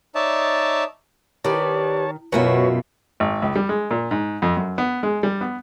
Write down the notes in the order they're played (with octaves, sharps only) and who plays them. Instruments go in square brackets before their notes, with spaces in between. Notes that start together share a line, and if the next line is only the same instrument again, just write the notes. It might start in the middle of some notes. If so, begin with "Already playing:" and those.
[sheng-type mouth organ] D#4 C#5 D5 E5 A5
[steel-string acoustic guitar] D#3 [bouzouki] G4 B4 D5 [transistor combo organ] C#5 A5
[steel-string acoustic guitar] F#2 F4 E5 [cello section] B2 [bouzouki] F#4 F#5 [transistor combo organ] B4 C#5
[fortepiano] G#1
C#2
G3
G#3
A#2
G#2
F2
F#2
B3
G#3
G3
B3